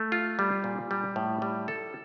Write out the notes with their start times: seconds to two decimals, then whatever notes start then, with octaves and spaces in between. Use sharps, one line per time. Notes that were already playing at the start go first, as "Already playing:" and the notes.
Already playing: A3
0.12 F4
0.39 G3
0.64 A#2
0.91 G3
1.16 A2
1.42 G3
1.68 A4